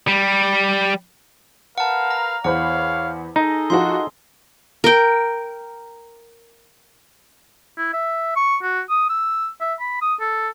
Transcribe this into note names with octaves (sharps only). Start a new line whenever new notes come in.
G3
A#4 B4 F5 F#5 A5
A#5
E2 C5 C#5 F5 F#5 B5
D#4 G#4 A4 D#5
F3 F4 F#4 C6
A#4 G5
E4
E5
C#6
F#4
D#6
E6
E5
B5
D#6
A4